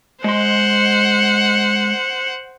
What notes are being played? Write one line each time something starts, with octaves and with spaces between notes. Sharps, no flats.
G#3 C5 F#5 C6